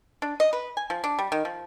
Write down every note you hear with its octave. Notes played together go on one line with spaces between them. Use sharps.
D4
D#5
B4
G#5
F3
D4
G3
D#3
F3